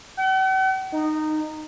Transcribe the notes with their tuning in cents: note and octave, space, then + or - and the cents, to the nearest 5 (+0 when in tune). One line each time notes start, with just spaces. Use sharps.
F#5 +45
D#4 -15